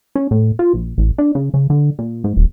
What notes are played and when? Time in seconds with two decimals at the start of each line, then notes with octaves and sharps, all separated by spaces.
0.15 C#4
0.31 A2
0.59 F4
0.73 A#1
0.98 A1
1.18 D4
1.35 C#3
1.54 C#3
1.70 D3
1.99 A#2
2.24 G#2
2.37 D#1